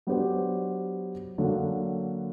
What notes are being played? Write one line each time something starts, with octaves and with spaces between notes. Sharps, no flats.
F#3 B3 D4 G4 C5
D3 F#3 A#3